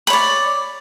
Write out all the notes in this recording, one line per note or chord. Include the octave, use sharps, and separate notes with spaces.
C#5 D5 B5